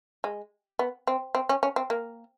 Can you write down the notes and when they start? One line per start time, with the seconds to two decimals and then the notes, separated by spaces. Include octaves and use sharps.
0.24 G#3
0.79 B3
1.07 C4
1.35 C4
1.49 C#4
1.63 C#4
1.76 C4
1.90 A#3